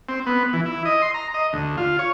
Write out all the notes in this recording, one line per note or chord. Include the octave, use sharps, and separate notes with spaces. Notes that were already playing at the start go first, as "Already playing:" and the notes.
C4
B3
E3
E4
D#5
C6
A#5
D#5
D2
F4
C#5